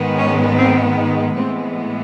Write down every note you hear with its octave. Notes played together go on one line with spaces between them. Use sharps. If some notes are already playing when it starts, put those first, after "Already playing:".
Already playing: G#2 D#3 G#3 B3
C#4
C4
A2 E3 G#3 B3 C4